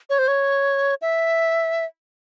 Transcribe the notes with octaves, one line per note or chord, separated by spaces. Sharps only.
C#5
C5
C#5
E5